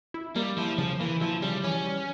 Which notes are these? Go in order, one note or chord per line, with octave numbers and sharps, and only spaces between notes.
E4
G3 A#3
F3 E4
C#3 F3
E3 A#3
F3 E4
C#3 G3
E3 C#4
G3